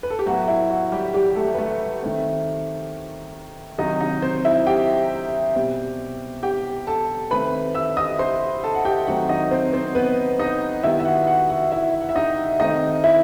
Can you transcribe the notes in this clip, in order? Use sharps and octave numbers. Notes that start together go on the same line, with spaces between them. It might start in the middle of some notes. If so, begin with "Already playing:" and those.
B4
A4
G4
A2 F#3 B3 F#4
E4
F#4
G3 G4
G3 G4
A3 A4
B4
A3 A4
D#3 A3 C4
C3 D#3 F#3 D#4 D#5
D#4 D#5
C4 C5
E4 E5
G4 G5
B2 G3 C4
G4 G5
A4 A5
D#3 A3 C4 B4 B5
E5 E6
D#5 D#6
C5 C6
A4 A5
F#5
G4 G5
D#3 F#3 A3 C4 F#4 F#5
D#4 D#5
C4 C5
C4 C5
B3 B4
D#4 D#5
D#3 G3 B3 E4 E5
E5
F#4 F#5
F#4 F#5
F#4 F#5
E4 E5
F#5
E5
D#4 D#5
D#3 A3 C4 D#4 D#5
E4 E5